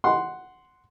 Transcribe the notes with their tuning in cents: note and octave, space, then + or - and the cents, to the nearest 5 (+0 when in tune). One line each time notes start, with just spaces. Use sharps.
F#5 +0 C6 -5